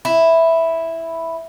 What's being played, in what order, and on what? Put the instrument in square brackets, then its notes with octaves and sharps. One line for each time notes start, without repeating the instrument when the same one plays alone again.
[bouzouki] E4